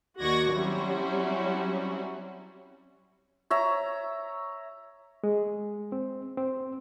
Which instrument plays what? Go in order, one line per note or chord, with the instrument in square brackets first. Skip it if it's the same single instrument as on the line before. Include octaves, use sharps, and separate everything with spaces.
[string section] D#2 F#4 D5 C#6 G#6 A#6
F#3 G3 C4 C#4 E4 F#4
[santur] C#5 E5 A#5
[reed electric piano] G#3
C4
C4